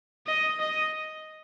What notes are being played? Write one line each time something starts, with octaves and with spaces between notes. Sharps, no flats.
D#5
D#5